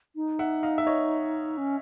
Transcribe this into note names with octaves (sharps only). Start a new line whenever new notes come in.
D#4
E5 F#5
D#5 F5
E5
C#5 D#5
C#4